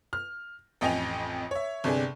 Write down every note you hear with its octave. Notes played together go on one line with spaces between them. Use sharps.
F6
A1 F2 D#5 G5 G#5 F7
C#5 E5
G1 C3 D4 G#4